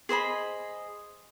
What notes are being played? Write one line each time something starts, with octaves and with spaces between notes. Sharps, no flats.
G#4 C5 D#5 B5